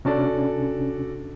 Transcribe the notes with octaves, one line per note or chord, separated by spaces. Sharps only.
C3 C#4 D4 F#4 A4 D5